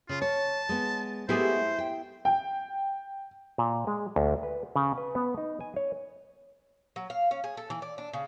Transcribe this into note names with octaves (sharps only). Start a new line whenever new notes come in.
C#3 F4
C#5 A5
G#3 B3
G#3 A3 B3 E4 G4 G#4 C5
G5
G5
A#2
G#3
D2
B4
C#3
B4
B3
D#4
G#5
C#5
F#3
F5
C#4
G#4
A4
E3
D5
D4
C#3